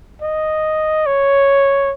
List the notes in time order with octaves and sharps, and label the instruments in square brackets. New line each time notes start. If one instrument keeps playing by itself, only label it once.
[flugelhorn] D#5
C#5